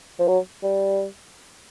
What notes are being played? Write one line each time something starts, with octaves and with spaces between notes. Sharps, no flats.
F3
F#3
G3